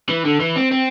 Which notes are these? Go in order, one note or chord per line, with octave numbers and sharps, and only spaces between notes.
E3
D3
E3
C4
C4